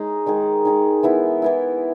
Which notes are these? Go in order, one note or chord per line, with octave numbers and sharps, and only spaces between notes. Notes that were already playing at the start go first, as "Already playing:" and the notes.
Already playing: G#3 D#4 G#4 D#5
D#3 G#3 D#4 G#4
D#3 G#3 D#4 G#4
E3 B3 E4
E3 B3 E4